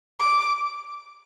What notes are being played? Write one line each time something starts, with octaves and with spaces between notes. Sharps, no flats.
D6